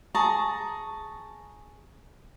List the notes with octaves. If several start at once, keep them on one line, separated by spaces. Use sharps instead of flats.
G#4 A5 A#5 C#6